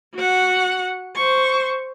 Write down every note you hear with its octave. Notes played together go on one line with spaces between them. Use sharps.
F#4 F#5
C5 C#6